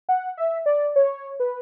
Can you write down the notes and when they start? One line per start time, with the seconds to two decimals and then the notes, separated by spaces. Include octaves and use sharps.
0.09 F#5
0.38 E5
0.66 D5
0.96 C#5
1.40 B4